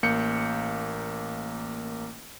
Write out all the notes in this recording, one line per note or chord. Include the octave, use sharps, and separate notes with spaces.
A1 A#3 G6 C#7